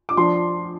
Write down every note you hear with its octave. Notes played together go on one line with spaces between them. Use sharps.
D6
F3 D4 C6